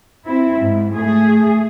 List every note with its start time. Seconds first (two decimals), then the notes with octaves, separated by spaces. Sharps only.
0.24 C4 E4
0.59 G#2
0.94 A3 G#4